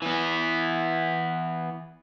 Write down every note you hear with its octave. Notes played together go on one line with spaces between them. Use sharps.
E3 B3